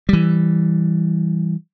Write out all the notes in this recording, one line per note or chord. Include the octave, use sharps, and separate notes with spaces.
E3 G3